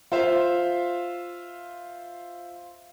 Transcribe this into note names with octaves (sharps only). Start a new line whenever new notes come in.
F4 C5 E5 F5